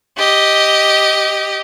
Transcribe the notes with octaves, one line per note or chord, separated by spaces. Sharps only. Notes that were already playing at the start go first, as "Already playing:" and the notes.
G4 D#5